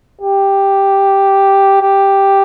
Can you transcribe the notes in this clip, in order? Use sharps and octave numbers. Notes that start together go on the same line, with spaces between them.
G4
G4